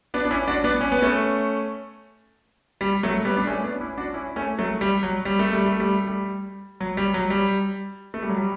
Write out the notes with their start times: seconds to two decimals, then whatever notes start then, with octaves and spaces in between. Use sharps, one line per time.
0.14 B3 D4
0.25 D4
0.31 C#4 E4
0.48 D4 F#4
0.64 B3 D4
0.81 C#4
0.92 B3
1.02 A3 C#4
2.81 G3
3.03 F#3 A3
3.25 G3 B3
3.37 D4
3.47 A3 C#4
3.64 B3 D4
3.81 C#4 E4
3.97 D4 F#4
4.14 C#4 E4
4.36 A3 C#4
4.59 F#3 A3
4.81 G3
5.03 F#3
5.25 G3
5.39 A3
5.53 G3
5.66 A3
5.80 G3
5.94 A3
6.07 G3
6.81 F#3
6.97 G3
7.14 F#3
7.30 G3
8.14 A3
8.22 G3
8.29 F#3
8.38 G3